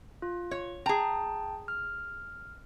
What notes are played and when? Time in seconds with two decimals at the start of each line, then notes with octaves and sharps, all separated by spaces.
0.22 F4
0.51 C#5
0.86 G#4 G5 A5 A#5
1.68 F6